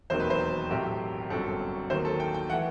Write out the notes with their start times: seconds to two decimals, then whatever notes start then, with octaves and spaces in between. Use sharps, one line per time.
0.10 E1 D#2 D#3 F#3 C4 C5
0.20 B4
0.30 C5
0.69 B1 A2 F#3 A3 C4 G4
1.30 G1 F#2 F#3 C4 A4
1.90 D#2 D#3 F#3 C5
2.05 A4
2.20 G5
2.34 G5
2.50 E3 A3 F#5